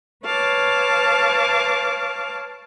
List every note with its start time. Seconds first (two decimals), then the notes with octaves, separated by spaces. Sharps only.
0.25 B4 C#5 F5 A5 D6